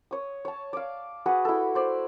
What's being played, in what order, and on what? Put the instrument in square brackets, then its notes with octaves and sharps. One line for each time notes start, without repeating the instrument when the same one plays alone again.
[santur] C#5 D#6
C#5 A5
D5 F5
F#4 G#4 B4 F#5
E4 A4
C5 D5